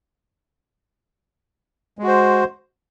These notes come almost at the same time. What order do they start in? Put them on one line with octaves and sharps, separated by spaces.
G#3 F#4 C5